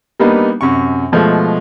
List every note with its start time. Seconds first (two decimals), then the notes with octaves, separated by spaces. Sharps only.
0.20 G3 A#3 B3 D4 D#4
0.61 F#2 C3 C#6
1.12 B2 F3 G#3 A3